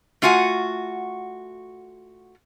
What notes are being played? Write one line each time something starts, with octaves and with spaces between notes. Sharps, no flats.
A3 F4 F#4 F#5 G#5